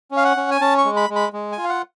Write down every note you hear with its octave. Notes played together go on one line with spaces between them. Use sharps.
C#4
F5
F#5
C#4
G#5
C#4 A5
C#6
G#3
B5
G#3
B5
G#3
G#5
F4
F5
F#5